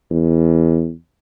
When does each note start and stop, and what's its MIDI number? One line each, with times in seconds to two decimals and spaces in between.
0.11 0.91 40